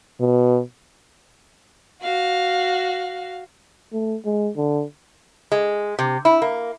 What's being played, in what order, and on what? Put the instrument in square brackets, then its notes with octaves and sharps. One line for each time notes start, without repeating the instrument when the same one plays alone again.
[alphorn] B2
[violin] F#4 F5
[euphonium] A3
G#3
D3
[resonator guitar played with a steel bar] G#3
C3
E4
A#3